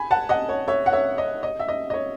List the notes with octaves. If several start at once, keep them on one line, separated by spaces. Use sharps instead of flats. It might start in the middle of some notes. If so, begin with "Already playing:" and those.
Already playing: G#5 B5
F#5 A5
D#5 F#5
C#5
C#5 E5
F#5
C#5 E5
D#5
D#5
E5
D#5
D#5
C#5